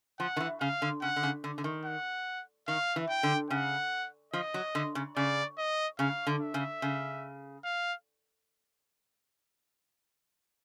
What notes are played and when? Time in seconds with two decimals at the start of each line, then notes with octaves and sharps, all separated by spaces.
0.19 F3 F#5
0.37 D#3
0.40 E3
0.61 C#3 F5
0.82 D3
1.02 C#3 F#5
1.16 D3
1.23 C#3
1.44 D3
1.58 D3
1.64 D#3
1.85 F#5
2.68 D#3 F5
2.96 E3
3.09 G5
3.23 D3
3.50 C#3 F#5
4.33 F3 D#5
4.54 F#3
4.75 D3
4.95 C#3
5.16 C#3 D5
5.58 D#5
5.99 C#3 F5
6.27 D3
6.41 E5
6.54 C#3
6.82 C#3
7.64 F5